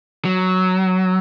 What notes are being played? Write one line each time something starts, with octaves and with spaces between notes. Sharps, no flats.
F#3